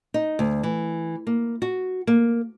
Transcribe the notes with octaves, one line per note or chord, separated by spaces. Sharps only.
D#4
D2
E3
A#3
F#4
A#3